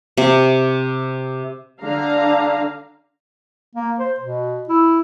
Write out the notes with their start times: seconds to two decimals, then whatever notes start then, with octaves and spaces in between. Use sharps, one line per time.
0.17 C3
1.82 D3 D4 F5 A#5
3.75 A#3
3.99 C5
4.20 B2
4.69 E4